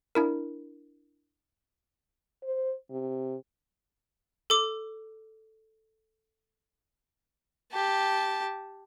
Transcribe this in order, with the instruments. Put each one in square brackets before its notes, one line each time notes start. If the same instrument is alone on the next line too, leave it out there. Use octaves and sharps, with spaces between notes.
[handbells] D4 E4 A#4
[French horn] C5
C3
[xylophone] A4 D6
[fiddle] G4 A5